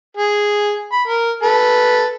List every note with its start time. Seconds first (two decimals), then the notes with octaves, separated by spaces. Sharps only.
0.17 G#4
0.92 B5
1.08 A#4
1.43 A4 B4